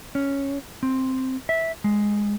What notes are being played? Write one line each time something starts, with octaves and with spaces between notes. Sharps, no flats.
C#4
C4
E5
G#3